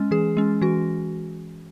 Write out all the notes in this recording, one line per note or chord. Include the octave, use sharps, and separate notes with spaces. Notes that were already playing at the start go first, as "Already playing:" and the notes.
Already playing: G#3 C#4
E3 G#4
G#3 C#4
E3 F#4